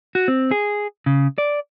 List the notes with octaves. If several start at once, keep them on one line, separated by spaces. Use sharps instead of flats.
F#4
C4
G#4
C#3
D5